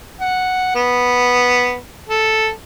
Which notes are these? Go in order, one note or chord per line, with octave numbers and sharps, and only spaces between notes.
F#5
B3
A4